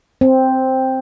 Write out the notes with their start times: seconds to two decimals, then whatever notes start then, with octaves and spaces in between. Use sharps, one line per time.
0.21 C4